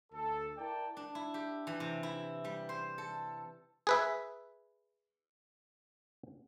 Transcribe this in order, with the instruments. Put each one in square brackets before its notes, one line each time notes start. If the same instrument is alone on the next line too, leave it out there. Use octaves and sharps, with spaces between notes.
[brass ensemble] D2 A4
E4 A#4 D5 G5 A5
[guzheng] D4
E4
G4
E3
C3
E4
G3
C5
A4
[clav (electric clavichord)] G#4 B4 E5